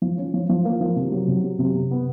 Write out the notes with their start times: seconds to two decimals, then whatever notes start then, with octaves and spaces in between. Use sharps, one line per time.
0.02 F3
0.17 C#4
0.34 F3
0.49 F3
0.65 A#3
0.81 F3
0.96 C3
1.12 F#3
1.28 C3
1.44 F#3
1.59 C3
1.75 C3
1.91 B3